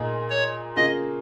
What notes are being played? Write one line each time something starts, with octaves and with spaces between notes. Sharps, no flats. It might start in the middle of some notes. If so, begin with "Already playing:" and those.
Already playing: A#2 A#3 D#4 G#4
C#5
C#3 A#3 F4 G#4 D#5